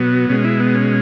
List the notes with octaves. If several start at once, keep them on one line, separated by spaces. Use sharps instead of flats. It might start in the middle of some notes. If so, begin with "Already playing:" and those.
Already playing: B2 F#3 B3
B2 G#3 C#4
E4
B3
C#4